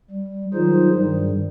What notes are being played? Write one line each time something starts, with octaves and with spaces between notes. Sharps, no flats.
G3
D#3 F#3 D#4 F4 G#4 C5
G2 D#3 G3